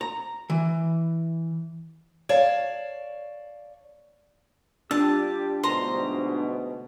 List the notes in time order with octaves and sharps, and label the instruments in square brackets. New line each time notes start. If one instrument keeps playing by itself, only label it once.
[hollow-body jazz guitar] A#5
E3
[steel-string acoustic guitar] C#5 D5 F5 A5
[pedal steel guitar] G3 F4 E6 [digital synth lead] D4 [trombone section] G4 [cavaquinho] A5
[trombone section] D2 G#2 B2 [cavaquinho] C5 A#5 C6